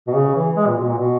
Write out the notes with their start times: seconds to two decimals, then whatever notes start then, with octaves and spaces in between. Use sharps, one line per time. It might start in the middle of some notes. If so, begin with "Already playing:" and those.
0.08 B2
0.15 C#3
0.35 E3
0.56 G#3
0.67 A#2
0.78 B2
0.88 A#2
0.98 B2